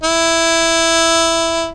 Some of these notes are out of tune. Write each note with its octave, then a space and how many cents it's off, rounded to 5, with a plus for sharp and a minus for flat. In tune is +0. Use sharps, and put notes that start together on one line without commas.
E4 +5